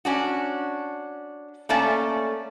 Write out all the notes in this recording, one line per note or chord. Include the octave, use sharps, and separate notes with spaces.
C#4 D4 F#4
A3 A#3 C#4 D5 A5